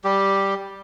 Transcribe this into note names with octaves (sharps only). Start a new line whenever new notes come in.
G3 G4